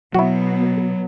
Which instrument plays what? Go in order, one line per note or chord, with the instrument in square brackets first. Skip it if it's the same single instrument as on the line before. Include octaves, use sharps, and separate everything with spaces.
[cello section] B2 B3 [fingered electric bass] F#3 [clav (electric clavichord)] E4 F#4